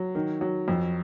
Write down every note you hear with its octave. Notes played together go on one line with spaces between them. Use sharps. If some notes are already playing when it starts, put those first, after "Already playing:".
Already playing: F#3
D#3
F#3
F2